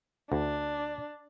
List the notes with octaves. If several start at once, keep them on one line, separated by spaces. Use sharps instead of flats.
D2 D4